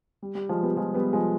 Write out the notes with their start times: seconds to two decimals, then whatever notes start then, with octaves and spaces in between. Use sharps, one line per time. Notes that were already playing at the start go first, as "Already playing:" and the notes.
0.22 G3
0.35 G3
0.49 F3 G#3
0.63 G3 B3
0.76 F3 G#3
0.94 G3 B3
1.13 F3 G#3